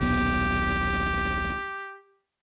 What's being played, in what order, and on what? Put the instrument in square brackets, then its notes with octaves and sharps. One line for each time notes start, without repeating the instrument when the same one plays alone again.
[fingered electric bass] D#1 B1 B3 [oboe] G4